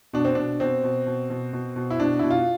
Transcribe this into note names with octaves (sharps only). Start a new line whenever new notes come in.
B2 D4
C4
B2 D4
B2 C4
B2
B2
B2
B2
B2
E4
B2 D4
B2 E4
F4